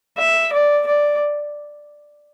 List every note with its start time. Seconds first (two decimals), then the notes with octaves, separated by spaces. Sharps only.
0.18 E5
0.52 D5
0.87 D5